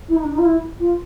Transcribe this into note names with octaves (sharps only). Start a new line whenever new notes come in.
E4
D#4
D4
D#4
F4
E4
F4